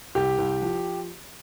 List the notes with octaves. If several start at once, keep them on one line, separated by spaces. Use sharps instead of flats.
C2 G4
C2
F3